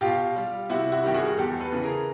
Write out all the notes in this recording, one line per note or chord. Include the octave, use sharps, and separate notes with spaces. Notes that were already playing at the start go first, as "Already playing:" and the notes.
B2 F4 G4
G3
C3 E4 F#4
E4 F#4
D#3 G3 G4
F#4 G#4
E2 G4 A4
A4 B4
C#3 E3
G#4 A#4